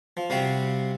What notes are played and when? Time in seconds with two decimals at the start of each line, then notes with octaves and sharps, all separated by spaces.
0.17 F3
0.30 C3 G3 F#4 F5 G5